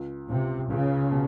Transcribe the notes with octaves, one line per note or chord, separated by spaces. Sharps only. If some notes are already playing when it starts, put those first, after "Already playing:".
Already playing: C#2
C#2 C3
C#2 C#3
B2